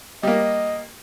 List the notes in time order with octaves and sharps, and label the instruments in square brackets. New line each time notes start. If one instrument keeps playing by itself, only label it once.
[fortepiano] G3 A#3 [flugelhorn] D#5